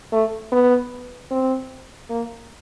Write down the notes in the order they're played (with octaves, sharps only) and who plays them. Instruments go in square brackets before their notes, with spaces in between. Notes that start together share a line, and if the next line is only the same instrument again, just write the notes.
[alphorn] A3
B3
C4
A#3